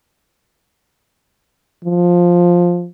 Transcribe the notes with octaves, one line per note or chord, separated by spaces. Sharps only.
F3